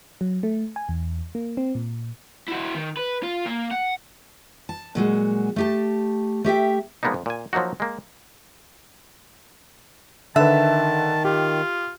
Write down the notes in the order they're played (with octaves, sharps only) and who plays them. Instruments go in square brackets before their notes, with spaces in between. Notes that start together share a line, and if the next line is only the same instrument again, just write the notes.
[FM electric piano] F#3
A3
G#5
E2
A#3
C4
A#2
[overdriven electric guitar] E4 F#4
D#3
B4
F4
A#3
F#5
[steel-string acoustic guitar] A5
A#2 F#3 G#3 F#4
A3 G4 A5
A3 G4 E5 G5
[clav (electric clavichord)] F3 G#3 A#3 B3 D4 D#4
F2
A#2 G#5
F3 F#3 A#3 D#4 F#4
G#3 A#3
[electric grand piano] D3 B4 [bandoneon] D#3 [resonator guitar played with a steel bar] E5 [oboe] A5
[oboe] F4 [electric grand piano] G4